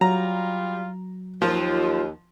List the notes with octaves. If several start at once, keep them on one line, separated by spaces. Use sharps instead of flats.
F#3 G3 F4 A#5
D#2 F3 F4